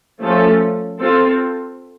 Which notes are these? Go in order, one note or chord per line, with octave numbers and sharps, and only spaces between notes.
F3 A3 C#4 F4 A4
C4 F4 A4